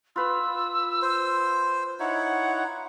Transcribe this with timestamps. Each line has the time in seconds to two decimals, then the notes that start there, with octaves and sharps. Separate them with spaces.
0.16 F4 B4 E6
1.02 C5
2.00 D#4 E4 C#5 F#5